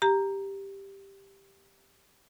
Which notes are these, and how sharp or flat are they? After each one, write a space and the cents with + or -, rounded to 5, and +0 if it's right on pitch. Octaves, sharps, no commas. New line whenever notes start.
G4 +0 A#5 +0